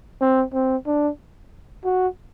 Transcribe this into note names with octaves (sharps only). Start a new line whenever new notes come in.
C4
C4
D4
F#4